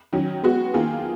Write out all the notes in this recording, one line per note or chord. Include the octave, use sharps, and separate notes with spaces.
D#3 F#3 C#4
G#3 B3 F#4
D#3 A#3 F4 G#4